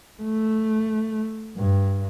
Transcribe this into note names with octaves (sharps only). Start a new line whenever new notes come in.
A3
G2